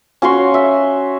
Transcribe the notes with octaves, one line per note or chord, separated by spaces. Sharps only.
C#4 F#4 C#5 C6
E5